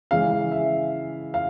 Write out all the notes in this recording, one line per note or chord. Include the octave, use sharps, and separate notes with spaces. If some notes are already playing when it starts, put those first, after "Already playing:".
C#3 E3 G#3 F5
E5
F5